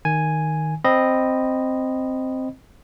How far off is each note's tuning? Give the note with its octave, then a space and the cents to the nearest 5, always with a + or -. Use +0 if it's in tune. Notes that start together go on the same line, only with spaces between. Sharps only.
D#3 +0 G#5 +0
C4 +0 D#5 -5 B5 +0